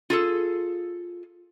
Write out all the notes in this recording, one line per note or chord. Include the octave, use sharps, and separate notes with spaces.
F4 G#4 A4